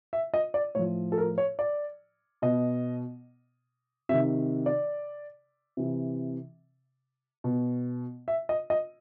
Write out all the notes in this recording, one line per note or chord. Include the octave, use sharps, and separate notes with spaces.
E5
D#5
D5
A2 F3 C#5
A4
A#4
C#5
D5
B2 D#5
C3 D#3 E5
D5
C3 E3
B2
E5
D#5
D#5